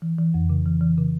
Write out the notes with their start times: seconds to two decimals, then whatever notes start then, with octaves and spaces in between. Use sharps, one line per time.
0.02 E3
0.19 E3
0.34 F2
0.50 C#3
0.66 E3
0.81 E3
0.98 C#3